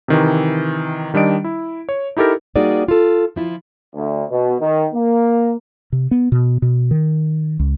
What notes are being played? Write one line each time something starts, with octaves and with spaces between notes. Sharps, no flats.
C3 D#3 E3
D#3 G3 D4 D#5 D7
E4
C#5
D#4 E4 G4 A4 A#4
G3 A#3 D#4 F#4 G#4 D5
F4 A4
F3 E4 F4
D2
B2
D#3
A#3
C3
B3
B2
B2
D#3
C#2